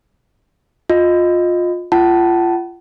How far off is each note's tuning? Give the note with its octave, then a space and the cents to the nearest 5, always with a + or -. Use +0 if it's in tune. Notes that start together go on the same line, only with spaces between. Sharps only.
F4 +20 D#5 +0
F4 -25 F#5 +40 A5 +0